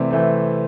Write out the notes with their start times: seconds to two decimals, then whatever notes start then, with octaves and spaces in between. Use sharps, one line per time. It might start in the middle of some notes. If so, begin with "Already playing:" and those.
Already playing: C3 E3 A3 C4 D5 E5
0.10 E3 A3 C4